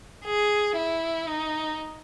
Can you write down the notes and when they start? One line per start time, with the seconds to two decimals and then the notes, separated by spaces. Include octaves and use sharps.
0.25 G#4
0.76 E4
1.27 D#4